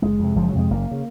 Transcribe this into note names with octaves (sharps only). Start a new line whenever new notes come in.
F#1 G#3
F2 C3
F#1 F3
F#3
F2 C3 G#3
F#1 A#3
C#3